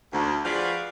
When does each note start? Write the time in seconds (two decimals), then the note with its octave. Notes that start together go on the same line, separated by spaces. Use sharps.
0.13 D2
0.45 F3 F#4 G#4 B4 D5 F5